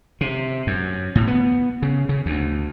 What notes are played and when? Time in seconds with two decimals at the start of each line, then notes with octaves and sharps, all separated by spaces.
0.21 C3
0.67 F#2
1.15 A2
1.27 B3
1.82 C#3
2.09 C#3
2.26 D2